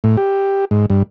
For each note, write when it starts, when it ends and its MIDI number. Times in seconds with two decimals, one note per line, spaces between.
0.04 0.16 45
0.17 0.65 67
0.71 0.86 44
0.90 1.03 43